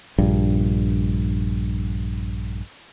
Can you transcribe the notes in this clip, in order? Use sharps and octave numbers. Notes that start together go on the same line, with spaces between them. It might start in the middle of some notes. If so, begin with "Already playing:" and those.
A#1 G2